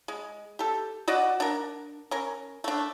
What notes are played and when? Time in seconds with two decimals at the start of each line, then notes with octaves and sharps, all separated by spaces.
0.08 G#3
0.59 G4 A4
1.08 F#4 D5 D#5 F#5
1.40 D4 A#4
2.11 C#4 A#4
2.64 A3 D4